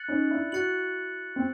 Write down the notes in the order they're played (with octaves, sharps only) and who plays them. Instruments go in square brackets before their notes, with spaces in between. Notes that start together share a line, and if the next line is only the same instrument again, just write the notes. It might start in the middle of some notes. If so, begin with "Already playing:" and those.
Already playing: [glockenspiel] F#6 A6 C#7 F#7
[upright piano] C#4 D#4
D4 E4
[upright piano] E4 F#4 [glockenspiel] F#6 A6 C#7 F#7
[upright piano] C4